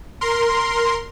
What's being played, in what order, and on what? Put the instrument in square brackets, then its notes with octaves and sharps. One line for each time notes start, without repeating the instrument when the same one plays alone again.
[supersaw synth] A#4 C6